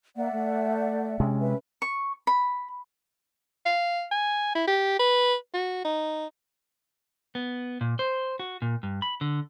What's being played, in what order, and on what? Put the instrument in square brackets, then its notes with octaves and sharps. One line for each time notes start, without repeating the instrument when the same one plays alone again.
[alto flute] A#3 [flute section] D5 E5 F#5
[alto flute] A3
[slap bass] C3 G#3 [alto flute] C#4
[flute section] B4 E5
[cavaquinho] C#6
B5
[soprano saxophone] F5
G#5
E4
G4
B4
F#4
D#4
[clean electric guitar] B3
A#2
C5
F#4
A#2
G2
B5
D3